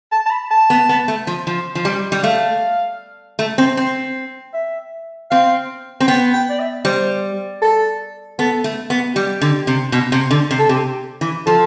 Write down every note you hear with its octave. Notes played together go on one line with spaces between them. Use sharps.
A5
A5
B5
A5
B3
B3
A3
F3
F3
F3
G3
G3
A3 F5
A3
C4
C4
E5
C4 F5
C4
B3 G5
G5
D5
E5
G3 C5
A4
B3 A4
A3
B3
G3 G4
D3
C3
B2
C3
D3
C3
A4
C3 G4
E3
F3 A4